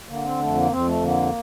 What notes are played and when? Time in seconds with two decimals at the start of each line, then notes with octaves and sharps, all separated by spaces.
0.09 D3 A#3
0.24 C4
0.40 F2 A3
0.56 A#3
0.70 F2 C4
0.87 A3
1.02 D3 A#3